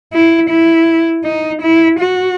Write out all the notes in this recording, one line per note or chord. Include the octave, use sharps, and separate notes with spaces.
E4
E4
D#4
E4
F#4